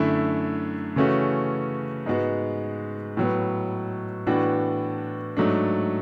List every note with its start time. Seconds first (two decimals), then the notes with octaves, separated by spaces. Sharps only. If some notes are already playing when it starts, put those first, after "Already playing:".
Already playing: F#2 D3 A3 E4
0.96 C#3 E3 A3 C#4 F#4
2.06 G#2 G#3 B3 F#4
3.17 A2 F#3 B3
4.27 A2 E3 B3 D4 F#4
5.37 G#2 F#3 A3 D4